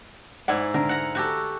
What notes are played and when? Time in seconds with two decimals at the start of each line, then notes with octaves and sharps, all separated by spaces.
0.48 G#2 E4 D5 F#5
0.74 D3 A#4
0.89 F#5 A#5
1.15 F#4 G4 A4